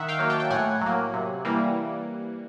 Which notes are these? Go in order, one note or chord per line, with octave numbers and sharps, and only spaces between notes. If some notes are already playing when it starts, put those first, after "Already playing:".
Already playing: D#3 E5 F#5
F5 G5
F#3 A#3
G5 A5
G5
A2 F#5 G#5
F#3 A#3
C3
E3 G3 A#3